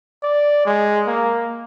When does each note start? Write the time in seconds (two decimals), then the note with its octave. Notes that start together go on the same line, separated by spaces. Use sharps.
0.23 D5
0.66 G#3
1.07 A#3